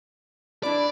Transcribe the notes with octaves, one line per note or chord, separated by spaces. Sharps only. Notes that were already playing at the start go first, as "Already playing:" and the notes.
D4 E4 B4 D5